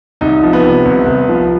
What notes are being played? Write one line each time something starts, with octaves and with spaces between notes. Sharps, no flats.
C2 D#4
F3
B3
C3
C2
C2
F3